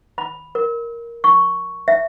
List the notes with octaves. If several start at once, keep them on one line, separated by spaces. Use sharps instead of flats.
B5
A#4
C#6
E5